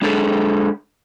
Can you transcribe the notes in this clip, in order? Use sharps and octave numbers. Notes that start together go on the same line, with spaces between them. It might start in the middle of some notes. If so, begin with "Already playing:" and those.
G#3 D4 G#4 A4